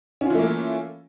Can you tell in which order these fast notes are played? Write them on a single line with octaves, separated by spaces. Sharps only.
C#4 F4 E3 A3 A#3